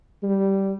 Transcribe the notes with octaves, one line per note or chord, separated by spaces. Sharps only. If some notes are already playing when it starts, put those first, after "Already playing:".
G3